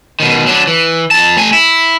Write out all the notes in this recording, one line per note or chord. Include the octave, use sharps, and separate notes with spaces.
B2 D#3
F#3 D4
E3
F2 A5
A3 G#5
E4